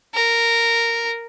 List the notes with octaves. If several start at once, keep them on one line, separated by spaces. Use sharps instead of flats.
A#4